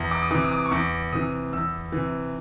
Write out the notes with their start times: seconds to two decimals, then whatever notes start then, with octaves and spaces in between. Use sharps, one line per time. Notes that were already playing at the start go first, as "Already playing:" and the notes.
Already playing: E2
0.11 D6
0.22 D#6
0.31 C3 E3 D6
0.44 D#6
0.51 D6
0.66 C#6
0.71 E2 D6
1.13 C3 E3 D#6
1.53 E2 E6
1.92 C3 E3